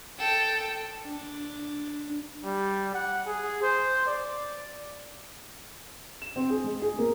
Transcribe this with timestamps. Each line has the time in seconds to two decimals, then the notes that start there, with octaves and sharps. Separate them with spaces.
0.19 A4 G5
1.06 D4
2.44 G3
2.94 F#5
3.27 G#4
3.62 C5
4.07 D5
6.22 E7
6.36 C4
6.50 G#4
6.64 G#3
6.82 G#4
6.98 A#3